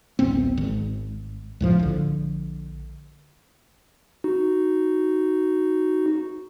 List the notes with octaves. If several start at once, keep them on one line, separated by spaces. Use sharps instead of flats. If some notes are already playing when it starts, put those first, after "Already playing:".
D1 A1 B3 C4
G#1
C#2 A2 F3
A#1 D3
D#4 F#4